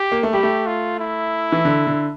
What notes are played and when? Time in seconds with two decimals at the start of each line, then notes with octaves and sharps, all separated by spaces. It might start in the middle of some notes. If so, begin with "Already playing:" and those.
Already playing: G4
0.12 A#3
0.23 A3
0.33 G3 G4
0.43 A3
0.67 F4
0.99 E4
1.52 E3
1.65 D3
1.87 D3